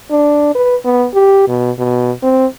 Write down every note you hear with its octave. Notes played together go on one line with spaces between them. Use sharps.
D4
B4
B3
G4
B2
B2
C4